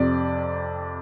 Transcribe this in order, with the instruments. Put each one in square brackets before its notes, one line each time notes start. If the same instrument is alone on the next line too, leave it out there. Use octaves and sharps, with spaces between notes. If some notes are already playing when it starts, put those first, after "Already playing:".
Already playing: [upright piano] F2 C3 D5